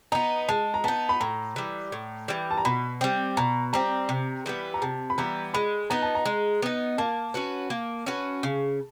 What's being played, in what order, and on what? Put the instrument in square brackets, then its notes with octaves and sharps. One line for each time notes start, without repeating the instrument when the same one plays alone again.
[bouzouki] B3 D#4 [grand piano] A#5
[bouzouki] G#3 [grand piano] A5
[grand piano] A#5
[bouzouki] B3 D#4 [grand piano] A5
[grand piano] B5
[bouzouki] A2 [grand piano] A#5
[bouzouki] E3 G3
A2
E3 G3
[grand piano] A5
A#5
[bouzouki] B2 [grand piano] B5
[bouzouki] G3 C4
[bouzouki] B2 [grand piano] A#5
[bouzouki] G3 C4 [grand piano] A#5
[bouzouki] C3
E3 G3 B3
[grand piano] A#5
[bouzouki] C3 [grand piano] A5
[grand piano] B5
[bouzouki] E3 G3 B3 [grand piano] A#5
[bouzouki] G#3 [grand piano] B5
[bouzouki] B3 D#4 [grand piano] A#5
[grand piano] A5
A#5
[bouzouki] G#3
B3 D#4
[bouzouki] A#3 [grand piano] A5
[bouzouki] C#4 F#4 B4
A#3
C#4 F#4 B4
C#3